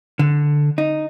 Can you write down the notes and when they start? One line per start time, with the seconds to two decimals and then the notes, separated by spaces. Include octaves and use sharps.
0.19 D3
0.78 D#4